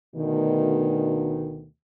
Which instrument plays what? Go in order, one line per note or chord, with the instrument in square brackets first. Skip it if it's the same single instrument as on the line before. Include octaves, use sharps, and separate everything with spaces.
[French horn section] D2 B2 D#3